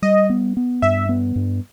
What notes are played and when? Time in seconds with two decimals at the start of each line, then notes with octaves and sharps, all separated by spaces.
0.02 G3 D#5
0.30 B3
0.57 B3
0.82 G2 E5
1.09 B3
1.36 G2